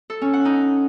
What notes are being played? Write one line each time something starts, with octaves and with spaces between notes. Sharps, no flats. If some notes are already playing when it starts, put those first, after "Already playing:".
A4
C#4
F#5
D#4